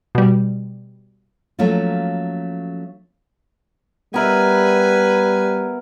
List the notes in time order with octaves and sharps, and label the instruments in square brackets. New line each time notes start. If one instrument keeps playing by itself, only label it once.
[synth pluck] B2 G3
[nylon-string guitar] F3 F#3 A3 A#3 C#4 F4
[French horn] G3 [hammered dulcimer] B3 A#4 E5 [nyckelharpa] B4 G#5